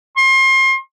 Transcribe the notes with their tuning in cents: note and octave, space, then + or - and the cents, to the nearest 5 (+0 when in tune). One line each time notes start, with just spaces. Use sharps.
C6 +35